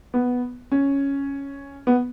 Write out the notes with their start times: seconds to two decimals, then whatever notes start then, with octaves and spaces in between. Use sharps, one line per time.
0.14 B3
0.71 C#4
1.87 B3